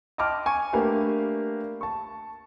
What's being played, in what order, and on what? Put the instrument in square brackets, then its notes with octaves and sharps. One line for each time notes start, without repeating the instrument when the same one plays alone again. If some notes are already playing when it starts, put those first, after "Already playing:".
[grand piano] D#5 G5 A5 C6 D6 F6
G#5 C#6
A3 A#3 D4 G4 B4 F5
A5 C#6